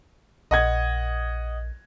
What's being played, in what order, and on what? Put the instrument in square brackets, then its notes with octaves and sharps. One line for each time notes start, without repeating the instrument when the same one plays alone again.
[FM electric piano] A#1 [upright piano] D#5 F#5 G#6